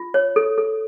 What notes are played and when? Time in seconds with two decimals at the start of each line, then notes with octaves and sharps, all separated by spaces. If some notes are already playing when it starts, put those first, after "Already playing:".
Already playing: F4
0.14 C#5
0.36 A4
0.58 A4